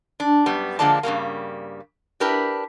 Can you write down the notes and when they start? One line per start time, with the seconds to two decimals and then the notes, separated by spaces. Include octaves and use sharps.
0.20 D4
0.46 F#2 G3 B3
0.79 D3 F3 G#3 A#3 D5 A5
1.03 G2 C#3 G3 A#3
2.20 D4 E4 G4 A#4 B4